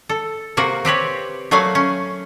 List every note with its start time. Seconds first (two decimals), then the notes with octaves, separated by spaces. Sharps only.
0.09 A4
0.57 C3 A#3 F#4
0.85 C4 G4 B4 C#5
1.51 F#3 A3 A#3 F#4 F5 G#5
1.75 C#4